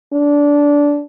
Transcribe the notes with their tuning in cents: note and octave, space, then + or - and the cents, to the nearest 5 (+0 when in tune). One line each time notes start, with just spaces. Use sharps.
D4 -15